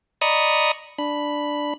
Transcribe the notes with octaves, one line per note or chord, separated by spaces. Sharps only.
D5 D#5 A#5 B5 C#6 D#6
D4 B5